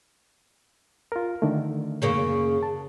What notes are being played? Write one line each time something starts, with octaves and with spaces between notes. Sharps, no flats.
F4 A#4
D3 D#3 A3
F#2 C#3 A#3
A5